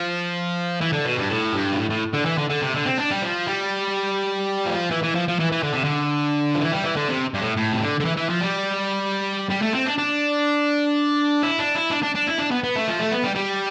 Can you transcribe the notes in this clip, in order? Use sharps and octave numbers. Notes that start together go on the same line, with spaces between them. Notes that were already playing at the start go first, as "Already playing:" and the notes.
Already playing: F3
E3
D3
B2
G2
A2
G2
B2
A2
A2
D3
E3
D3
D3
C3
D3
C4
D4
G3
F3
G3
F3
E3
E3
F3
F3
E3
E3
D3
C3
D3
F3
E3
G3
E3
D3
C3
G2
A2
A2
C3
D3
D3
E3
E3
F3
G3
G3
A3
C4
D4
D4
E4
D4
E4
D4
D4
D4
E4
D4
B3
B3
A3
F3
A3
B3
G3
G3